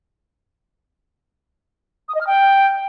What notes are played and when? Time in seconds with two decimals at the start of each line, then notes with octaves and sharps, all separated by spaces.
2.09 D#6
2.15 D#5
2.21 F6
2.27 G5